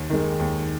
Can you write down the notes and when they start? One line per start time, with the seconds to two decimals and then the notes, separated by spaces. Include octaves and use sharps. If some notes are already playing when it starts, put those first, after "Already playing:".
Already playing: D#2
0.10 D#3 G#3
0.40 D#2